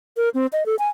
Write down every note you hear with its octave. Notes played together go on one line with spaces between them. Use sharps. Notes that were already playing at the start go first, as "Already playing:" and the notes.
A#4
C4
D#5
A4
G#5